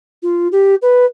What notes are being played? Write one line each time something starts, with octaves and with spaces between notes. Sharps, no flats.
F4
G4
B4